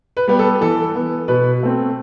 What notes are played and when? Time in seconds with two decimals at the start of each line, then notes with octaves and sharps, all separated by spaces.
0.17 B4
0.28 G3 B3
0.39 A4
0.61 E3 A4
0.95 B3
1.28 B2 B4
1.63 A3 C4